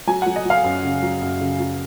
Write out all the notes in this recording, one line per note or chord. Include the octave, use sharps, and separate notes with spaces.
F#3 G#5
F#3 F#5
D#5
F#3 F5
F#2
C#3
F#3
F#2
C#3
F#3